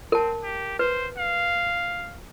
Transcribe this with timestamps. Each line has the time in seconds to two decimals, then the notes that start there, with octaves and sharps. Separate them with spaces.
0.12 C4 A#4 A5
0.43 G4
0.79 B4 C5
1.18 F5